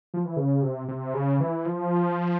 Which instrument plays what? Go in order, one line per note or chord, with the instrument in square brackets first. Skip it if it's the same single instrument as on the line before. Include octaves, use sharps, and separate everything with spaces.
[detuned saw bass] F3
E3
C#3
C3
C3
C#3
E3
F3